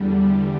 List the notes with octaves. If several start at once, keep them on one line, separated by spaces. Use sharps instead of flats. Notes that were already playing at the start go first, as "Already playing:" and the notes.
Already playing: E2 D3 G3